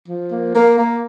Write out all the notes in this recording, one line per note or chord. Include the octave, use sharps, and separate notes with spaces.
F3
A#3
A#3
A#3